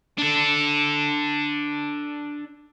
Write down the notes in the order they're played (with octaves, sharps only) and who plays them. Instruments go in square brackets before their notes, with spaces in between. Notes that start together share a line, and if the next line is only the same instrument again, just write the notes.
[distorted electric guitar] D4 A4